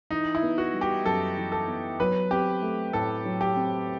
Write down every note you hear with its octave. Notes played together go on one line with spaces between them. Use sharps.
E3 D#4
E4
B3
F#4
G3
G4
F#2 A4
E3
A4
B3
F#3 B4
C4 G4
A3
A2 A4
F#3
G4
C4